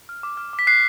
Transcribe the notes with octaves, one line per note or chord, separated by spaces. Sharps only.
F6
D6
F6
D6
B6
F#6 C7